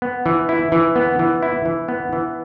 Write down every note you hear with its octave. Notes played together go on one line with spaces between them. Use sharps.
B3
E3
E4
E3
B3
E3
E4
E3
B3
E3